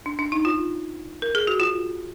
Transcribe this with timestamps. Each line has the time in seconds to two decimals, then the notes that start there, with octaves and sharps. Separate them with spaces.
0.06 D4
0.19 D4
0.32 D#4
0.45 F4
1.22 A#4
1.35 G#4
1.47 F#4
1.60 F4